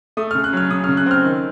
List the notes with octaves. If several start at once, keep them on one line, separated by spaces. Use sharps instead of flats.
A3 D#6
F6
C#3
F#6
F#3 F6
C#3 D#6
F6
C#3
F#6
C4 F6
D#3